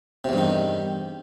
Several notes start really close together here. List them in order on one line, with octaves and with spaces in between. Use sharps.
C3 E2 G2 D#3